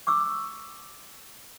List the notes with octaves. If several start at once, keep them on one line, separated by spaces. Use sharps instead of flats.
C#6 D6 E6